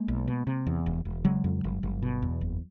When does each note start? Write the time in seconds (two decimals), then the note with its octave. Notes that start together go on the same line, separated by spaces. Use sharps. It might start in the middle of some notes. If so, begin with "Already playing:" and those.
Already playing: G#3 A#3
0.08 B1
0.27 B2
0.47 C3
0.67 E2
0.86 E1
1.05 E1
1.25 C#3 F#3 G#3
1.44 F2
1.64 G1
1.83 G1
2.02 B2
2.22 E2
2.41 F#1